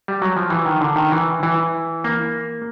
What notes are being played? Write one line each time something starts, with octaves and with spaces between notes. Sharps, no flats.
G3
F#3
F3
E3
D#3
D3
D#3
E3
E3
A#3